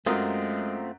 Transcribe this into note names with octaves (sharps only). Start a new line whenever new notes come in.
F#2 G#3 A3 C4 F4 A#4 D#6